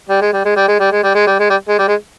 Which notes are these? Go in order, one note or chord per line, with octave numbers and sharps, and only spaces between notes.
G3
G#3
G3
G#3
G3
G#3
G3
G#3
G3
G#3
G3
G#3
G3
G#3
G3
G#3